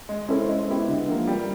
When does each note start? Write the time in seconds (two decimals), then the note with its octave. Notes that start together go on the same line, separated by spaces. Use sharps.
0.09 G#3
0.29 C#4 E4 A4 C5
0.48 G#3
0.68 B3 E4 G4
0.88 D3
1.08 F3 A#3
1.27 G3